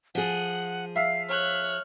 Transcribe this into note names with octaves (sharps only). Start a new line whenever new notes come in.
F3 G#4 F#5
E5 F5 C7
C#5 F6 F#6